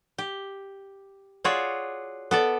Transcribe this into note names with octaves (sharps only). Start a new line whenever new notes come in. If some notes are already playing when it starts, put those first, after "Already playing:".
G4
F4 F#4 G#4 C#5 D5
B3 A4 D5